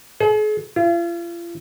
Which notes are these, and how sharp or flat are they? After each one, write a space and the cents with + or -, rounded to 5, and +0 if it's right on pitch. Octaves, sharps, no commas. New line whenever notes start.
G#4 +40
F4 -40